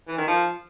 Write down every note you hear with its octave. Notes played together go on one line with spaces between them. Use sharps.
E3
D#3
F3